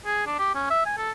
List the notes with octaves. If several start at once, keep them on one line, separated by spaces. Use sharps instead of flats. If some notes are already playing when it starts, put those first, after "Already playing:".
G#4
D4
G4
C#4
E5
G#5
A4